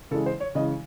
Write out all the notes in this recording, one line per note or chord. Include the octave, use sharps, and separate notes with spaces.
C#3 E3 G#3 A4
C5
C#5
C#3 E3 G#3 D#5